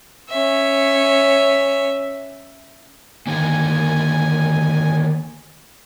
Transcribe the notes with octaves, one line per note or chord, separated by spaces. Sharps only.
C#4 E5
D3 D#3 A#3 G#5